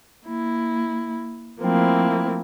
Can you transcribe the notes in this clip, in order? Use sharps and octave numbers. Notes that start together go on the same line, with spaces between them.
A#3 E4
F3 A3 A#3 C4 E4